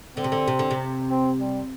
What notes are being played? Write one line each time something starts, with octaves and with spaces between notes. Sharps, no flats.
D3 C4
C3
D3
C3
D3
C3
C4
G3